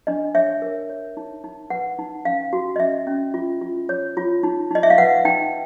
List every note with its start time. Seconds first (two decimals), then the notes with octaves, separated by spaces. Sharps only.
0.07 D4 D#5
0.35 C#5 E5
0.62 A#4
0.89 C#5
1.17 D#4
1.44 D#4
1.70 B4 F#5
1.99 D#4
2.25 C#4 F5
2.53 F#4
2.76 D#5
2.80 C#4 E5
3.07 C#4
3.34 F4
3.61 F4
3.89 C#5
4.17 F4
4.43 D#4
4.71 D#4 D#5
4.83 E5
4.90 F5
4.98 B4 F#5
5.25 D#4 G5